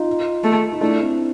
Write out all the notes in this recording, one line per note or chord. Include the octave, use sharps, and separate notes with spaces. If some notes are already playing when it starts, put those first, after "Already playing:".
Already playing: D#4 F4
A3
D#4
A3 D4 E4
C4 D4